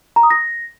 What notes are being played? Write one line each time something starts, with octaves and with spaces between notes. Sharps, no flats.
A#5
D#6
A#6